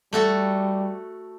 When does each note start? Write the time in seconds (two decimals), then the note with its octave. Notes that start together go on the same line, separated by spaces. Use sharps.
0.13 G3 A3 F#4 A4